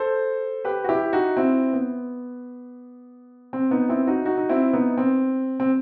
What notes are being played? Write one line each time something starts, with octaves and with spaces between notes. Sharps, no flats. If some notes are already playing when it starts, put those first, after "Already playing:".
Already playing: A4 C5
G4 B4
F#4
E4 G4
D#4 F#4
C4 E4
B3
C4
B3 D#4
C4 E4
D#4 F#4
D#4 F#4
D#4
C4 E4
B3 D#4
C4
C4